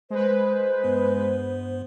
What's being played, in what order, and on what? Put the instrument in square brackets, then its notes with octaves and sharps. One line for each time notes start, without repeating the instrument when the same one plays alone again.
[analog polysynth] G#3 B4 [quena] C5
[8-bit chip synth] G2 B3